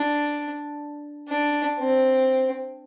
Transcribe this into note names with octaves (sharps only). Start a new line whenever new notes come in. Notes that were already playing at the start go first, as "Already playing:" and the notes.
Already playing: D4
D4
C4